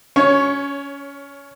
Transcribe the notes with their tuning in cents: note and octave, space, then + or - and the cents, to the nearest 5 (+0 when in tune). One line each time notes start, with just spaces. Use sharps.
C#4 +20 C#5 +0